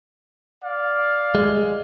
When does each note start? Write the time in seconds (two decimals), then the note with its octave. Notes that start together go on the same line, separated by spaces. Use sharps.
0.64 D5 F5
1.35 G#3